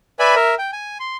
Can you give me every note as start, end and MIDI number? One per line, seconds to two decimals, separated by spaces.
0.19 0.35 71
0.19 0.35 74
0.19 0.35 76
0.19 0.35 80
0.19 0.35 83
0.35 0.55 70
0.35 0.55 76
0.58 0.71 79
0.73 0.98 80
1.00 1.17 84